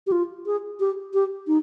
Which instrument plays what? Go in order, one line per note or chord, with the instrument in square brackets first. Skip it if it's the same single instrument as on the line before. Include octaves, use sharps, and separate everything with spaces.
[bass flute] G4
F4
G#4
G4
G4
D#4